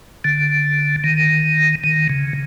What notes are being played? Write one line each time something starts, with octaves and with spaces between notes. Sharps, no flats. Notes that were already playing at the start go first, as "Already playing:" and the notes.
D3
D#3
D#3
C#3